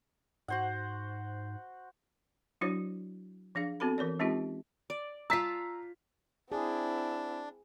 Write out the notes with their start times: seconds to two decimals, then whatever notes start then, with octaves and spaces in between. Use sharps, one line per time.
0.48 G#2 F#4 C5 F#5
2.61 F#3 D4 E4 F#4 C5 C#5
3.55 F3 D4 G#4 F5
3.80 B3 C4 F#4 A4 B5
3.98 E3 A#4 C#5 D5
4.19 G#3 C4 C#4 D#4 F4 G4
4.90 D5
5.30 F4 A5 A#5 E6 B6
6.52 C4 D4 E4 G#4